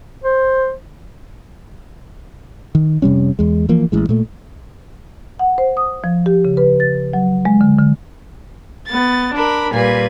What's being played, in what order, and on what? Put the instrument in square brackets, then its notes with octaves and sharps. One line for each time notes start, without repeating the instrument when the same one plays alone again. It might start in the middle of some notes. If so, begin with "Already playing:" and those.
[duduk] C5
[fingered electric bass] D#3
F1 C3 G3 C#4
E2 G#3
E3 F3 A#3
A1 E3 G#3
A#2 A3
[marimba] F#5
C5
D#6
F3
G4
C#3
B4
A6
F#3
G#3
D3
D3
[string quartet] B3 A6
D4 A#4 B5
A#2 G3 B4 G#5